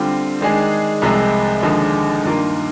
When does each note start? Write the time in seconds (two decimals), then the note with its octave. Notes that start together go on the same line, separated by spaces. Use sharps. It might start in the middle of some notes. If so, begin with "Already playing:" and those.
Already playing: D3 G3 C4 F4
0.41 D#3 G#3 D4 G#4
1.02 C2 C3 F3 G#3
1.63 D#2 D3 F3 G#3 D#4
2.24 G2 D#3 A#3 F4 A#4